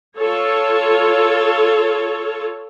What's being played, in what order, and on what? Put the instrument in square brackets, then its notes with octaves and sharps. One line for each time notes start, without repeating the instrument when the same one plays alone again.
[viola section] F4 A4 C#5